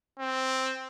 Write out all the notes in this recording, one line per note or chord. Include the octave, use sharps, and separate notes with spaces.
C4